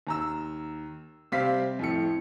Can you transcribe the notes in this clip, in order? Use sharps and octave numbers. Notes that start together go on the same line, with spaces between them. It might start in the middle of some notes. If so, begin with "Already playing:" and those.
D#2 A#5 E6
C3 G3 C4 F5 B6
F2 A2 C#7